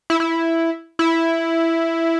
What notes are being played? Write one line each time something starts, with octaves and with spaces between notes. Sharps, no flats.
E4
E4
E4